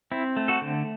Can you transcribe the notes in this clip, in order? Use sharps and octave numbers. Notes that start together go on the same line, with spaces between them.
C4 E4
A3
F#4 A4
D3